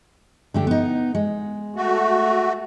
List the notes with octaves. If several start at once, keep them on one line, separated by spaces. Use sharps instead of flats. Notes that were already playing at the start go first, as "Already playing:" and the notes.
D3 A3 G4
B3 D#4
G#3
A3 F#4